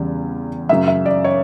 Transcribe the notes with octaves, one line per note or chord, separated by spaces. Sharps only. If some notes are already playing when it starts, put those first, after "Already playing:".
Already playing: E2 C#3 G3
F#2 C#3 F#3 E5
E5
D5
C#5